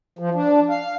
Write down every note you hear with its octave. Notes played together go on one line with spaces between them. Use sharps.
F3
D4
F5